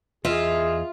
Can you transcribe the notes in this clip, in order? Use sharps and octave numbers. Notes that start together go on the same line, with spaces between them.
E2 F4 G#4 D#5 E5